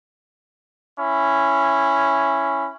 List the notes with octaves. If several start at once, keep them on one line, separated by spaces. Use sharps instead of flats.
C#4 E4